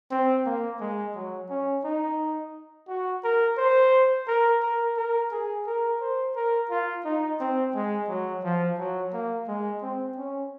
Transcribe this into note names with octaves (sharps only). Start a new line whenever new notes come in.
C4
A#3
G#3
F#3
C#4
D#4
F#4
A#4
C5
A#4
A#4
A#4
G#4
A#4
C5
A#4
F4
D#4
C4
G#3
F#3
F3
F#3
A#3
G#3
C4
C#4